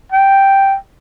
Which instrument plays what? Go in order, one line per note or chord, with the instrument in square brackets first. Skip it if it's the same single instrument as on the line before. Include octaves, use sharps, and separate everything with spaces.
[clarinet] G5